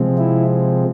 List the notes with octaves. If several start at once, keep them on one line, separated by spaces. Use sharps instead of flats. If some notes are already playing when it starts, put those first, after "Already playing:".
Already playing: C3 F3 G#3 C4
E4